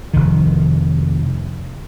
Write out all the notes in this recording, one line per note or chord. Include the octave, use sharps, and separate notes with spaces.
F1 D#3